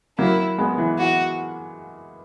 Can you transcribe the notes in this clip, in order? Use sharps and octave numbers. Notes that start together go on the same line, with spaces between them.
F#3 A#3 E4
G#3 B3
E3
E3 F#4